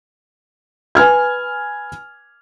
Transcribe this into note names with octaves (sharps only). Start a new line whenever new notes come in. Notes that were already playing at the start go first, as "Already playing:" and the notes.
B4 G#5 F6 G#6